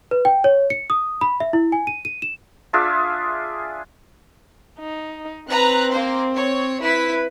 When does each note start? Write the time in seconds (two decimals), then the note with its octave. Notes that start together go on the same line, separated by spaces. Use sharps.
0.11 B4
0.25 G5
0.44 C#5
0.70 C#7
0.90 D#6
1.21 B5
1.40 E5
1.53 E4
1.72 G#5
1.87 D#7
2.05 D#7
2.22 E7
2.73 D4 F4 G#4 E5
4.80 D#4
5.49 C4 B4 A#5 F#6
5.91 A#3 C5
6.36 C#5
6.84 E4 B4 B6